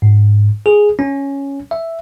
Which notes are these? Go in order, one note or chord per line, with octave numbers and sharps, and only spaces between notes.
G#2
G#4
C#4
E5